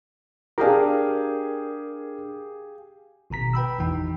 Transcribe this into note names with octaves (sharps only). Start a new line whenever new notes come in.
D4 G4 G#4 A#4 F5
G#1 B2 A#5 B6
B4 G5 B5 E6
G#1 E2 E3 D#4 G5